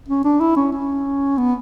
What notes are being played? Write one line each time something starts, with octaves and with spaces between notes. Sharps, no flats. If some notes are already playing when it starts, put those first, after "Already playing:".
C#4
D4
E4
C#4
C#4
B3